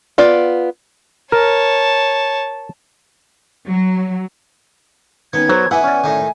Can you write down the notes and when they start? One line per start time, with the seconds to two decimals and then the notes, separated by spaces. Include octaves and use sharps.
0.18 B3 F4 D5
1.32 A#4 C#5 A5
3.68 F#3
5.33 D#3 B3 C#4 G#6
5.49 F#3 A#4 C5 C#5
5.71 E3 B3 E4 F#5 G#5
5.84 C#4 D5
6.04 A2 D#3